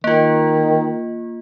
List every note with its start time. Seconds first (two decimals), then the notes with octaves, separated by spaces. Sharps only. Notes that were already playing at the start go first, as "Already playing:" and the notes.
0.04 D#3 A#3 F4